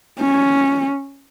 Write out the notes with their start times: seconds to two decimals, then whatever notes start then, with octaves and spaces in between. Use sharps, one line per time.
0.20 C#4